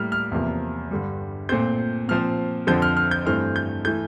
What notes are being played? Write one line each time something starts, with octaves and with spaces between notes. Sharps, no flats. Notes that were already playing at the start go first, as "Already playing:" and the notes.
Already playing: A2 G3 A#3 F6
F6
E2 C3 F3 A#3
G2 D3 G3
A#2 A3 C4 G6
A#2 F3 C4 F6
F2 D3 F3 C4 G6
F6
F6
G6
G2 E3 A3 C4 F6
G6
E3 A3 G6